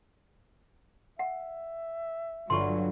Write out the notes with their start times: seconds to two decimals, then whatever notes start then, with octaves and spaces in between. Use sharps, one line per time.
1.19 E5 F#5
2.50 G1 F#3 F4 C6 C#6